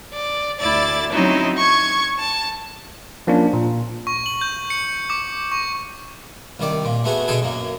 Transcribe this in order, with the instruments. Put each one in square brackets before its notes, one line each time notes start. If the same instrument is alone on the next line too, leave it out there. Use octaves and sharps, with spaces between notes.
[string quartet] D5
D2 E4 D5 A6
F#3 C4 C#4 D#4 E4
C#6 G#6
A5
[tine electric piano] F3 A#3 C#4 D4
A#2
[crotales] C#6
F#7
G6
C#7
D6
C#6
[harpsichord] C2 D#3 D5
A#2
A3 B3 F#4 G#4
B2 D3 G#4 A4 G#5
F#2 A#3